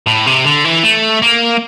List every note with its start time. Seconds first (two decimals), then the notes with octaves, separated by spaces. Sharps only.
0.07 A2
0.26 C3
0.45 D3
0.64 E3
0.84 A3
1.22 A#3